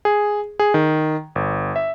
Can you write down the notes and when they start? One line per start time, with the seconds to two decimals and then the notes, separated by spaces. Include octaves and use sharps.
0.05 G#4
0.59 G#4
0.74 D#3
1.35 G1
1.76 E5